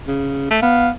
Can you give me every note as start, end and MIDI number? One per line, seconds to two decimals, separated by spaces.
0.07 0.48 49
0.50 0.58 57
0.62 0.91 59
0.62 0.90 77